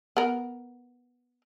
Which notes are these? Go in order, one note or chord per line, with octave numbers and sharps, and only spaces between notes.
B3 A#4